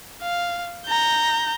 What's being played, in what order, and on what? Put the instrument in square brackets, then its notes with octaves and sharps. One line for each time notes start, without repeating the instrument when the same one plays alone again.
[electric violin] F5
A#5 G6